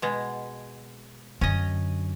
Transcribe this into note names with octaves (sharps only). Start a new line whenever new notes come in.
B2 G#3
F#2 D3 C#4 D#5